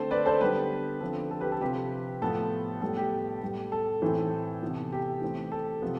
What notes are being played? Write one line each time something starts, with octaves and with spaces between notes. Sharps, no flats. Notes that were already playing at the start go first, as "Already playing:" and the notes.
Already playing: D3 A3 C4 A4 C5
B4 D5
A4 C5
D3 G3 B3 G4 B4
D3 F3 C4 A4
A4
G4 B4
A4
C3 F3 C4 G4 B4
A2 F3 B3 A4
A2 G3 B3 A4
G4
A2 G3 B3
A4
A2 E3 A3 C4
C3 E3 B3
G4
E3 A3 C4
A4
C3 F3 B3